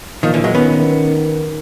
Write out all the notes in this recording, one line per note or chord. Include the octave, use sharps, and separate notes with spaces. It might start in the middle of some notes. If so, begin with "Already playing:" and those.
A#2 D#3 F3
D3 E3
F#3 G#3
D#3 B3 C#4